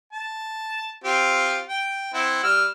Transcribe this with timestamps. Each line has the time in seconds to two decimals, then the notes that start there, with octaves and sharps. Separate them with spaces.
0.13 A5
1.04 C4 F4 G4
1.67 G5
2.14 C4 E4 F#5
2.43 G3 E6 F6